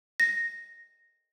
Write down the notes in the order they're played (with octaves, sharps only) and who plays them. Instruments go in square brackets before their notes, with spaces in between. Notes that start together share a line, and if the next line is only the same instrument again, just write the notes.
[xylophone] A#6